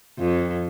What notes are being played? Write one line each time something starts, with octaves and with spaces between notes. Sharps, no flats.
F2